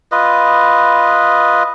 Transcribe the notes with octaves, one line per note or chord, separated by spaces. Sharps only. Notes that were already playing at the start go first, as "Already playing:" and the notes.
F4 B4 D#5